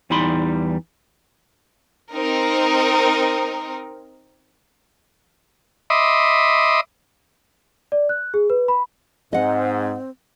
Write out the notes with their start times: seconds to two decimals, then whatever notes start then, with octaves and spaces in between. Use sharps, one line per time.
0.10 E2 E3 G3 D#4 B5 C6
2.14 C4 D#4 A#4
5.90 D#5 E5 B5 C6 D6 D#6
7.92 D5
8.09 F#6
8.34 G#4
8.50 B4
8.68 B5
9.33 G#2 C4 D#5 F#5